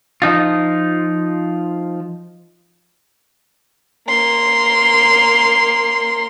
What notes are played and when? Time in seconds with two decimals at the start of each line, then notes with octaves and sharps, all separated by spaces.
0.22 F3 D#4 F4
4.08 A#3 C6